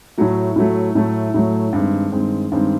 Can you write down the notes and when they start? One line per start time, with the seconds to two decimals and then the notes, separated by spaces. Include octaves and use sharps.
0.17 A2 F#3 A3
0.56 A2 F#3 A3
0.95 A2 F#3 A3
1.34 A2 F#3 A3
1.73 G2 D#3 G#3 C4
2.12 G2 D#3 G#3 C4
2.52 G2 D#3 G#3 C4